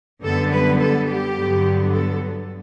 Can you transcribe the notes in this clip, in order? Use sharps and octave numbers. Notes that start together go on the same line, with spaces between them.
F#2 D3 G3 B3 A4
B4
A4
G4
G2 D3 F#3 B3
A4